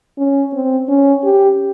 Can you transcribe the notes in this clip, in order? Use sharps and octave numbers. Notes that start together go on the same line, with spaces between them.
C#4
C4
C#4
G4